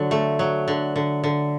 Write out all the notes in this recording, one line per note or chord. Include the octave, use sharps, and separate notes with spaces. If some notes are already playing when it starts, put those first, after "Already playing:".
Already playing: D3 F#3
A3
F#3
D3
D3
D3